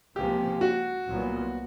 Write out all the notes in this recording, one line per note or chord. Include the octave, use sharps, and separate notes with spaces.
C#2 C3 F3 A#3 C#4 G4
F#4
C2 A#2 F#3 B3